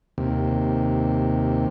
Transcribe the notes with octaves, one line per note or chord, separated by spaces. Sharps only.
D#2 C3